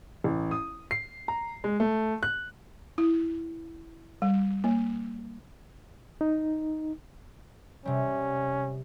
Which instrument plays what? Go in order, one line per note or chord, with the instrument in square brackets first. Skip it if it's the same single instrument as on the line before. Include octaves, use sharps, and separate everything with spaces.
[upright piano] A1
D#6
C7
A#5
G#3
A3
F#6
[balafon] E4
G3
A#3
[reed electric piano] D#4
[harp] C3 G3 [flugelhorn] C#4